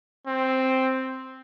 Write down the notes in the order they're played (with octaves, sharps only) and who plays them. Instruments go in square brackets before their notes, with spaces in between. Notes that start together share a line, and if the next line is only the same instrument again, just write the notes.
[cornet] C4